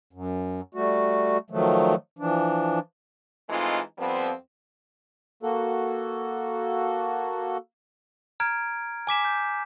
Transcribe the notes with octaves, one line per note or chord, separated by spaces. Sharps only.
F#2
G3 A3 F#4
D#3 F3 F#3 A3
E3 F3 D4
E3 G#3 A3 C4 D#4 F4
F2 F3 G3 B3 C4
A#3 F#4 A4
A#5 F6 G#6 D7
G#5 D6 B6 E7
G6